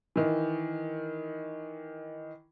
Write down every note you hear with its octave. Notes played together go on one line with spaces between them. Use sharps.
D#3 E3